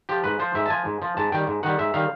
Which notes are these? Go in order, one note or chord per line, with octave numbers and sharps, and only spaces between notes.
F3 G4
G#2 B4
F3 C5
G#2 E5
A5
F3 G#5
G#2
F3
G#2 A5
D#3 G3 G5
G#2
D#3 G3 F#5
G#2 E5
D#3 G3 F5